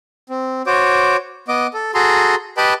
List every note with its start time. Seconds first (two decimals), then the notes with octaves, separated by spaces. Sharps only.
0.29 C4
0.67 F#4 C5 C#5 D6
1.48 B3 D#5 D6
1.74 A4
1.94 F#4 G#4 A4 A#5 C6
2.57 G4 B4 D#5 G5 A5 B5